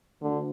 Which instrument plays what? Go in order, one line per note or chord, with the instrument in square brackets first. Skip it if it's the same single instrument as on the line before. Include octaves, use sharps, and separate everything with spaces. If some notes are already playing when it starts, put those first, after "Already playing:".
[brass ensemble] D2 [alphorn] D3